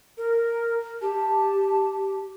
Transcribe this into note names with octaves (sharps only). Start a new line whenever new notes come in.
A#4
G4 A5